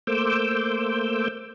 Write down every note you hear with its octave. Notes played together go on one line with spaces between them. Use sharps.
A3 A#3 C5 D6 E6 G6